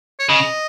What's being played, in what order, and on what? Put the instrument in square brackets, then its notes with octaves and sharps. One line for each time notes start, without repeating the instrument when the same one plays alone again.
[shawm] C#5
[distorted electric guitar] C#3 [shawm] D#5